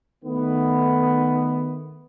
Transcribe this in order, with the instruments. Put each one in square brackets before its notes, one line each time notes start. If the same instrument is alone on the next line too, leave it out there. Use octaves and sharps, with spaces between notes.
[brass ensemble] D#3 A3 B3